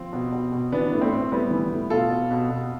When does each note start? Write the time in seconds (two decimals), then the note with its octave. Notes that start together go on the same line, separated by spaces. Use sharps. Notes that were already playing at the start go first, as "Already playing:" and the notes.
Already playing: F3 C4
0.13 B2
0.32 B2
0.52 B2
0.72 E3 B3 D4
0.92 A2
1.01 A3 C4
1.11 A2
1.32 A2 G3 B3
1.51 E3
1.70 A2
1.90 B2 F4 A4
2.10 B2
2.31 B2
2.50 B2